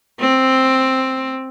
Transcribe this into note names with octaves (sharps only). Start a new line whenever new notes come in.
C4